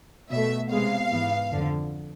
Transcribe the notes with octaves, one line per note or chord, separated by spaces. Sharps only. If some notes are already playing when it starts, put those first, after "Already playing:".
B2 A3 E5
C3 G#3 B3 F5
G#2 E3 B3
F2 D3 F3